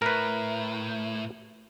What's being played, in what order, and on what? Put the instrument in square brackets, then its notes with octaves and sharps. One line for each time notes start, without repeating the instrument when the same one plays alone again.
[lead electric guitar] A2 [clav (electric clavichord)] A#4 B4